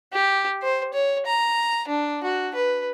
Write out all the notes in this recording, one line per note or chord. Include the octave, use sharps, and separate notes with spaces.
G4
C5
C#5
A#5
D4
F#4
B4